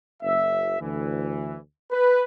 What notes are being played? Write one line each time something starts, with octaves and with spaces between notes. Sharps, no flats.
F#1 E5
D2 E3
B4